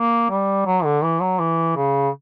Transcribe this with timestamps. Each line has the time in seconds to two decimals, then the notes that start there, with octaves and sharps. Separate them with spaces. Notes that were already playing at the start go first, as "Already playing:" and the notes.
Already playing: A#3
0.30 G3
0.66 F#3
0.84 D3
1.03 E3
1.21 F#3
1.39 E3
1.76 C#3